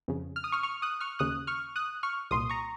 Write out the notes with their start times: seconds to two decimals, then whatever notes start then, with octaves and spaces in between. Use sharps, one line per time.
0.08 F2 C#3
0.36 F6
0.44 D#6
0.52 C#6 F6
0.63 C#6 F6
0.82 D#6 F#6
1.01 C#6 F6
1.19 D#2 C#3 D#6 F#6
1.47 C#6 F6
1.76 D#6 F#6
2.03 C#6 F6
2.31 C2 A#2 C6 D#6
2.50 A#5 C#6